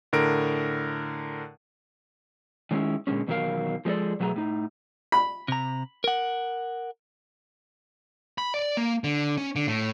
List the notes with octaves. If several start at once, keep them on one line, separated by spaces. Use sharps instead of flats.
A2 D3 A#4 D7
D#3 G#3 A3 C#4 E4
A#2 D3 G#3 C#4
E2 B2 D#3 F#3 A#4 F5
F3 G#3 A3 D4 A4 D5
B2 F#3 A3 G#4 A5 A#5
A2 D#4
B5
C3 A#5
A#4 F#5
B5
D5
A#3
D3
C#4
D3
A2